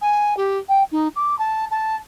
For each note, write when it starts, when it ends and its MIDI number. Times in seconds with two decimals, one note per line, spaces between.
0.01 0.34 80
0.37 0.58 67
0.68 0.83 79
0.91 1.08 63
1.16 1.37 86
1.39 1.65 81
1.71 1.96 81